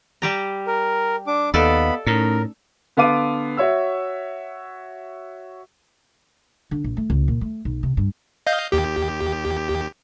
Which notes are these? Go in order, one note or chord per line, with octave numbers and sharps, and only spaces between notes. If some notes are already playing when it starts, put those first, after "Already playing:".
G3 G4 G5 A#5
A#4
D4 D6
D#2 B3 A4 D5 D#5 F5 B5
A2 A3 C#4 D#4 A#4
D3 B3 A4 F5 D6 D#7
F#4 C#5 E5 E6
D3
A#1
A3
C#2
A#2
A3
B1
C3
G2
D#5 F5 G6
D#2 G4